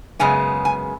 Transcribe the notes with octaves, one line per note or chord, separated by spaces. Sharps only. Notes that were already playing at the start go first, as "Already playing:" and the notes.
F#2 C#3 G#3 B3 G#5
G#5